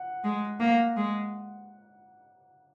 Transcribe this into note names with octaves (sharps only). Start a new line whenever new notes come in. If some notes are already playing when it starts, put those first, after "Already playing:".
Already playing: F#5
G#3
A#3
G#3